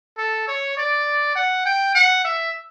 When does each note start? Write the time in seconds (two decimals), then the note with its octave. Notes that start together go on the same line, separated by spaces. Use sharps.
0.18 A4
0.48 C#5
0.77 D5
1.35 F#5
1.66 G5
1.95 F#5
2.25 E5